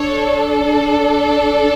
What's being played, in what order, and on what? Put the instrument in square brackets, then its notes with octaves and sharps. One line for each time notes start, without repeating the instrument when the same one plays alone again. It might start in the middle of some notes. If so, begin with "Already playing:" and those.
Already playing: [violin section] D4 A4 C#5